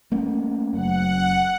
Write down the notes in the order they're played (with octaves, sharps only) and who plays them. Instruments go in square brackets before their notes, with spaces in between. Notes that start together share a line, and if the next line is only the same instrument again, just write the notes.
[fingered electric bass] A3 A#3 C#4
[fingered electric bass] F#1 F#2 [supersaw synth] F#5